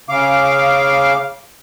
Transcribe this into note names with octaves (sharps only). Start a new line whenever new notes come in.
C#3 F5 D6